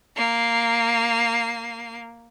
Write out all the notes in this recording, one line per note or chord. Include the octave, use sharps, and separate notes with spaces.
A#3 C7